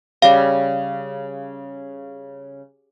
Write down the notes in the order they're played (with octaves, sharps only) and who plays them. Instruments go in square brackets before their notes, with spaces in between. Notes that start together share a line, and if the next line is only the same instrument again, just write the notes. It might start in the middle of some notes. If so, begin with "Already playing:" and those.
[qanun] C#3 G3 [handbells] F5